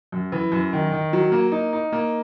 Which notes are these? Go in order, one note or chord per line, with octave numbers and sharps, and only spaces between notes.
F#2
E3
F#2
D#3
D#3
F#3
A#3
D#4
D#4
A#3